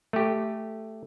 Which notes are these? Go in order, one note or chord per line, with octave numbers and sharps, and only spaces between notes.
A3 G4